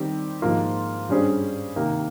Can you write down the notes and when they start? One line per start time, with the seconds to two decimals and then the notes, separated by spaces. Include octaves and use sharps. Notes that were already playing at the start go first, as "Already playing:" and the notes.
Already playing: D#3 G3 C4 G4
0.42 G#2 F3 A#3 F4
1.09 G2 G3 C#4 G#4 C5
1.76 C3 D#3 A#3